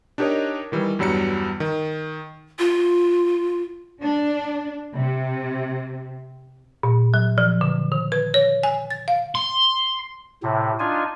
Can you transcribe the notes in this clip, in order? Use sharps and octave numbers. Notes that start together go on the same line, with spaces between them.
D4 D#4 G4 A#4 C#5 D#5
D#3 E3 G3
E2 G2 F#3 G3 A#5 C#7
D#3
F4
D4
C3
A#2
F#3
F3
D3
D#3
B4
C#5
G#5
A6
F5
C6
A2 C3
D4 D#4 F4 G#5